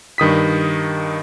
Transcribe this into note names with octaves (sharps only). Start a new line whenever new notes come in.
G2 D#3 D#6 B6